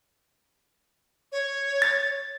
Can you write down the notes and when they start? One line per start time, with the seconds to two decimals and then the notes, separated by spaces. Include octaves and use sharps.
1.32 C#5
1.82 A6